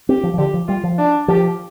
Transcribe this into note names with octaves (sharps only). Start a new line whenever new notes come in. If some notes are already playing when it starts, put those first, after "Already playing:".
C4 G4
F3
F3
D3 G4
F3
G3 F4
F3
D4
F3 G4